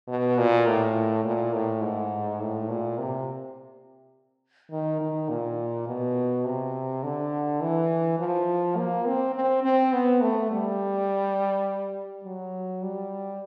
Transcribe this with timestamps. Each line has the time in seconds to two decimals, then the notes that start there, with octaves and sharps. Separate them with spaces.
0.08 B2
0.38 A#2
0.67 A2
1.25 A#2
1.54 A2
1.82 G#2
2.40 A2
2.70 A#2
2.98 C3
4.72 D#3
5.01 D#3
5.29 A#2
5.88 B2
6.45 C3
7.03 D3
7.61 E3
8.19 F3
8.77 A#3
9.06 C4
9.35 C4
9.64 C4
9.93 B3
10.22 A3
10.51 G3
12.25 F#3
12.83 G3